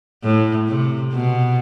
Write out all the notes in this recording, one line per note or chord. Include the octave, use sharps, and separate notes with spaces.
A2
C3
B2